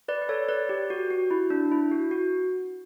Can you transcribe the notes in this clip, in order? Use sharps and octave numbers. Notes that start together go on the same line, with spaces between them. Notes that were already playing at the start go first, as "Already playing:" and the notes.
B4 D5
B4
A4 C#5
B4 D5
G4
F#4
F#4
E4
D4
E4
F#4
F#4